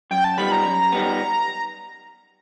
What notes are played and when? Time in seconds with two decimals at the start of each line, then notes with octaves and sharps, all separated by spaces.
0.11 F#2 G5
0.24 A5
0.38 D#3 G3 B3 B5
0.52 A#5
0.65 F#2
0.92 D#3 G3 B3